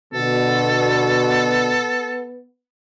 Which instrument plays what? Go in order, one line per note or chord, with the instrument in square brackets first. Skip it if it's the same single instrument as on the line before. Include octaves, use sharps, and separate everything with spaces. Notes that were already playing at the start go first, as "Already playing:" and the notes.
[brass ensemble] B2 D3 [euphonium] B3 [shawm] A4